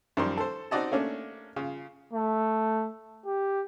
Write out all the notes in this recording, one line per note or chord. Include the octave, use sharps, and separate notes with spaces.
F#2 D#3 F3 G3 A#4 C6
A4 C5
C4 D#4 F#4 D5 D#5 A5
A3 A#3 C#4 D4
C#3 F4
A3
G4